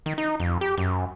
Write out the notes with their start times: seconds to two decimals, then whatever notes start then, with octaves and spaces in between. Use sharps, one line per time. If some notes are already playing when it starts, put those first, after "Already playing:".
0.06 D#3
0.18 D#4
0.40 F2
0.61 G4
0.78 F#2